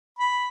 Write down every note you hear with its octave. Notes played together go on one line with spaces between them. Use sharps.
B5